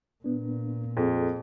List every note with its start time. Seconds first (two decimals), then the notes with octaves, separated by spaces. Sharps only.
0.24 A#2 B3 D4
0.97 F2 G#4 A4